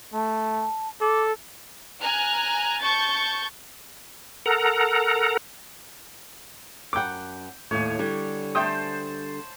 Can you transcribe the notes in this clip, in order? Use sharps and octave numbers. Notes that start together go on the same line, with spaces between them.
A3 A5
A4 D6
G#5 A#5 F6 F#6
A5 C#6 G6 A6
A4 A#4 F#5 A#5
F#2 F#5 G5 D6
D#2 A2 C#5 G#5
D3 G3
A3 C5 G5 A5 D#6